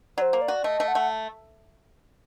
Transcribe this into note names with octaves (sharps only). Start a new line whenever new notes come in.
F#3 C5 D5
A#3
D5
F#4
A3 D#5
A3
F#5
A3